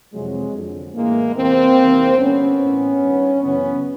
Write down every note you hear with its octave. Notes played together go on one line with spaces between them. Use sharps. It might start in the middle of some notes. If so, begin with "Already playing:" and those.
F2 C3 E3 F#3 G#3
F2 D3
A2 E3 G#3 A#3
E2 C3 E3 A#3 C4
E2 C3 D#3
G2 D3 B3 C#4
A2 E3
G2 D#3
F#2 C#3 E3 B3 C#4